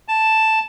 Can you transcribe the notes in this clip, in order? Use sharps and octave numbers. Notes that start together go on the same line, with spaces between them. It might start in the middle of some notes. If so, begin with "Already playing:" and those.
A5